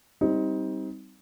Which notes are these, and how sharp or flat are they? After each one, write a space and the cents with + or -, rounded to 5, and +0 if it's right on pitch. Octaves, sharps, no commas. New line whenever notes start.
G3 +0 C4 +0 D#4 +20